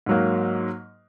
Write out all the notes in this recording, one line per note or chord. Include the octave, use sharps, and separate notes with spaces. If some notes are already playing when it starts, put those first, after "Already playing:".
G#2 F#3 A#3